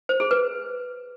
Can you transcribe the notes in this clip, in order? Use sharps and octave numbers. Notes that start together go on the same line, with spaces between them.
C5
G#4
B4